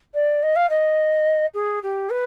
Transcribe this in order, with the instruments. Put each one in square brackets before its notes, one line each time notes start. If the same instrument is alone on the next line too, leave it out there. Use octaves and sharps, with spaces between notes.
[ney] D5
D#5
F5
D#5
G#4
G4
B4